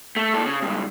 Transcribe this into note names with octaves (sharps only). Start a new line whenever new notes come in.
A3
A#2 A4
C#3
C#2 G2